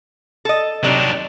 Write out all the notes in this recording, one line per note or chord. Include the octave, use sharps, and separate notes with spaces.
A4 D#5
C3 F#3 G3 D4 D#4